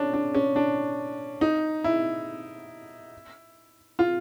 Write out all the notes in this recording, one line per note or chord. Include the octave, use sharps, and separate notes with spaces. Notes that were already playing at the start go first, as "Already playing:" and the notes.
Already playing: C#4 D4
D4
C#4
D4
D#4
E4
F4